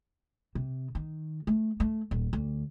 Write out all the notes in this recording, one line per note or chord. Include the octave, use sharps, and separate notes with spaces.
C3
D#3
A3
A3
D#1
D2